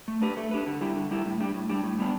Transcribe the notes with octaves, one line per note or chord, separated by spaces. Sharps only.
A3
D4 G4 B4
A3
D4 G4 B4
D3
G3 E4 G4
D3
G3 E4 G4
A2
G3 D4 G4
A2
G3 D4 G4
A2
G3 B3 D4